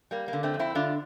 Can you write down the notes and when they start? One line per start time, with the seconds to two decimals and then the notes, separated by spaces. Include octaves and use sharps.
0.11 G3 A#3
0.28 D3 A#3
0.43 A3 C4
0.54 F2
0.59 C4 E4
0.75 D3 D4 F4